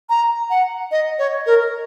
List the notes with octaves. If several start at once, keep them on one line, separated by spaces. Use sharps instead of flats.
A#5
F#5
D#5
C#5
A#4